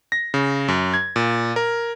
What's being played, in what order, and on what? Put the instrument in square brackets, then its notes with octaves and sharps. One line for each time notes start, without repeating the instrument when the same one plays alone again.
[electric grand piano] A#6
C#3
F#2
G#6
A#2
A#4